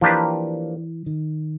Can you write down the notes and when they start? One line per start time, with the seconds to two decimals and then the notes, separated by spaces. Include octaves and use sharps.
0.01 E3 F3 A#3 D4 G4 B4
1.06 D#3